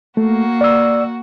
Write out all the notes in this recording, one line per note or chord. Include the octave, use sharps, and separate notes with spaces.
A3 A#3 F#4
D5 E6